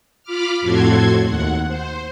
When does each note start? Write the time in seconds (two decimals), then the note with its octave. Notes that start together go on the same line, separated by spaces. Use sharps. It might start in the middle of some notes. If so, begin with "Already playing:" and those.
0.23 F4 B5 D6 F6
0.61 F2 A2 F#4 A4 C6 G#6
1.22 D#2 F#5
1.66 C5